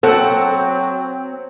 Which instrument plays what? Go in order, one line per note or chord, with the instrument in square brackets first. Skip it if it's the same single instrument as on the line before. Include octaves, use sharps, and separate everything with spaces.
[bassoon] F#3 [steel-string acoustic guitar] C4 [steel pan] A4 F#5